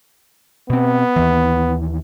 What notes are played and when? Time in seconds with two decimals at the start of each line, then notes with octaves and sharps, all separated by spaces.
0.70 B2 B3 C4
1.16 D#2 E3